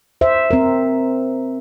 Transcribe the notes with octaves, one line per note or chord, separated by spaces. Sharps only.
C5 E5
C4 A#4